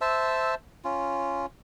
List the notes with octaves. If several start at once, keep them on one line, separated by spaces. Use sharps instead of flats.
C5 E5 A5 E6
C#4 F4